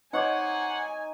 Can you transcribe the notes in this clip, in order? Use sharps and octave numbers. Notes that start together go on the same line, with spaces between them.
D#4 C5 C#5 F#5 G#5 D6